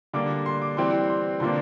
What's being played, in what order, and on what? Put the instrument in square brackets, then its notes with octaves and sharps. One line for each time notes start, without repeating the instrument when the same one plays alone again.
[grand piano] D3 G3 A#3 D4 D6
C6
D6
E3 G3 C4 C6
C6
D3 F3 A#3 D4 C6